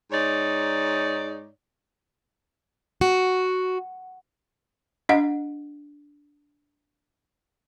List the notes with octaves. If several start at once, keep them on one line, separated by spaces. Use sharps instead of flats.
G#2 D#4 C#5 D5
F#4
D4 D#5 F#5